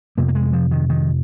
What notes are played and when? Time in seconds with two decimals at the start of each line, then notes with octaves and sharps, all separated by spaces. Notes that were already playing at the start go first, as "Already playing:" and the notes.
0.18 F2 C3 A#3
0.28 A#3
0.35 G#3
0.53 F3
0.71 D#3
0.90 D#3